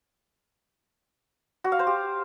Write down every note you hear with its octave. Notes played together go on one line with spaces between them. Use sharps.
F#4
F5
C5
G4